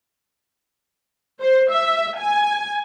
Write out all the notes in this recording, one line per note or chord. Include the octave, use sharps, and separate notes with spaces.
C5
E5
G#5